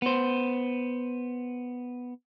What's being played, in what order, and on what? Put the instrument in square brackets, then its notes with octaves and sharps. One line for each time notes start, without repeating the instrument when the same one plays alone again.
[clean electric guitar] B3 C5